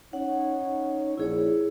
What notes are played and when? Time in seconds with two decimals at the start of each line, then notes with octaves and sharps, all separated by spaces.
0.13 C#4 D#4 C#5 F#5
1.17 A#1 E4 G#4 C#5